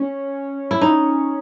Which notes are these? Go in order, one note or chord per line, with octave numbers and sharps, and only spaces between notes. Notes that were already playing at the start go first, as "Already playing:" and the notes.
Already playing: C#4
E4
D#4